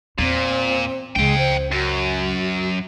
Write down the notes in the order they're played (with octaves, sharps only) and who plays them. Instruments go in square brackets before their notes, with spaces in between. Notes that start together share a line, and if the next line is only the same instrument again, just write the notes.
[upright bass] E2 [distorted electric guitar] A#2 [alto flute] C4
[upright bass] C#2 C#3 [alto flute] G#3 [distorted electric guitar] F5 G5
[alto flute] C5
[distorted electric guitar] F#2 [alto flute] F#4